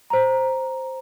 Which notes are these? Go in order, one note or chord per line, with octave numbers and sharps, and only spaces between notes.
C5 A#5